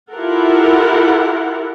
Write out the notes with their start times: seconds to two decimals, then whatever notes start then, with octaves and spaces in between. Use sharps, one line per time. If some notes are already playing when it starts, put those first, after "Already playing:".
0.11 E4 F4 G4 A4 A#4 F#5